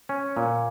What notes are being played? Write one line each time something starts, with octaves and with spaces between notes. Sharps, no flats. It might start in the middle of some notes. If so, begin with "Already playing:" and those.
C#4
A#2